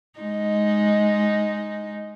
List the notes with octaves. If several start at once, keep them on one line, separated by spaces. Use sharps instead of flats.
G#3 D#4